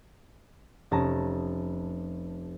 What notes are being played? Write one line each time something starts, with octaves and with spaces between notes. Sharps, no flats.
F1 C#4 A5 A#5